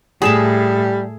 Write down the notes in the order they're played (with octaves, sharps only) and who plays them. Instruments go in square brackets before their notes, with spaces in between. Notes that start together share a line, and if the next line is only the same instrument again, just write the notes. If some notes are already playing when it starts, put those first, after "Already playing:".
[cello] A2 [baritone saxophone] G3 [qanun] G#4 E5 A5